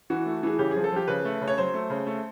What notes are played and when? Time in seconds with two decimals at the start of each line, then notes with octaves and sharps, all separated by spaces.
0.10 E3 F#4
0.26 A3
0.43 E3 G#4
0.59 C#3 G4
0.71 F3 G#4
0.84 A4
0.92 F3 G4
1.08 C#3 B4
1.25 A3
1.41 C#3
1.48 C#5
1.58 F#3 C5
1.74 A3
1.90 C#3
2.07 A3